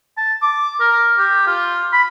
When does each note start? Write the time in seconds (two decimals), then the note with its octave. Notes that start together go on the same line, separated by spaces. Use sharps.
0.18 A5
0.42 D6
0.80 A#4
1.18 G4
1.47 F4
1.93 B5